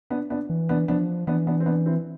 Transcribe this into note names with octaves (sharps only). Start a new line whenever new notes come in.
B3 D4
B3 D4
E3
B3 D4
F3 B3 D4
E3 B3 D4
B3 D4
C4
B3 D4
C4 E4